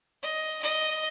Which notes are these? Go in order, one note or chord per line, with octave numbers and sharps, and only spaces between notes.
D#5
D#5